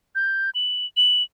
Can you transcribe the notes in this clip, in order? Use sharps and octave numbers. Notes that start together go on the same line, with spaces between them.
G6
F#7
F#7